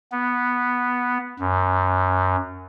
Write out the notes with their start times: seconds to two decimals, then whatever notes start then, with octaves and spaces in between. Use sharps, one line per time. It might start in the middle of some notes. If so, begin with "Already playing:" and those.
0.12 B3
1.40 F#2